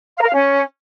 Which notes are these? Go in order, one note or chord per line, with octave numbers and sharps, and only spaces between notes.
F5
A#4
F5
C#4